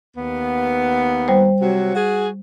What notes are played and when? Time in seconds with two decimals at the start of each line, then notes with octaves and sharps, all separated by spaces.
0.17 D#2 B3
1.28 G3 C5
1.61 C3 F#3 F#4
1.95 F#4 G#4